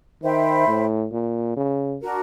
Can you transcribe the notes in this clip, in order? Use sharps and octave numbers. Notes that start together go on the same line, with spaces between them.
D#3 C5 E5 G5 B5
A2
A#2
C#3
D4 F#4 A#4